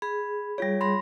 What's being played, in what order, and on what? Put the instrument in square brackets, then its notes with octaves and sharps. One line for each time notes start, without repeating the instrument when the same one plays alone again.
[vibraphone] G#4 [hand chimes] B5
[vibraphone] G3 G#4 [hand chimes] F4 C#5
[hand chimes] B5 C6 A#6